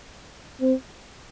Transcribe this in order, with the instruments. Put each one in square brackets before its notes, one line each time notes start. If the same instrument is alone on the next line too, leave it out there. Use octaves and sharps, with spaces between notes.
[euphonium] C4